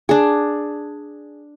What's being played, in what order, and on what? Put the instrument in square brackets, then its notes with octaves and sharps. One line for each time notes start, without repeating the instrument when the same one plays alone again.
[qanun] D4 G#4